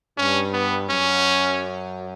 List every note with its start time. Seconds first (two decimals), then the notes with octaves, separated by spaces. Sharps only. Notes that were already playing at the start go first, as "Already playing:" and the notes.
0.17 G2 C#4
0.53 B3
0.89 F#2 C#4